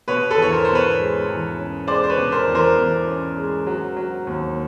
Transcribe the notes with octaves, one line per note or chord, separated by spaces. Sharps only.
B2 B4 C#5
A4 B4
E2 C#5
A#4 C5
B2 C5
B4 C#5
G#3
E2
C#4
G#3 C5 D5
C5
B4 C#5
B2
A#4 C5
E2
A#4 C5
E2
C#4
G#3
F#3
F#3
D#2